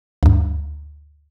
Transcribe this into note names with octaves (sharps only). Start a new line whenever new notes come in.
D2 G2